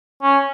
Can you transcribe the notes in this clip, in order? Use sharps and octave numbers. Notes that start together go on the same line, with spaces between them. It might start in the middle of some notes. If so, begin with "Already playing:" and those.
C#4